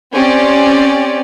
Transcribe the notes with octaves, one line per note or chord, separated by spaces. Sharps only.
C4 C#4 G4 D5